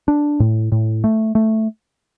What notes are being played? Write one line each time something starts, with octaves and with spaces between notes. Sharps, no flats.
D4
A2
A2
A3
A3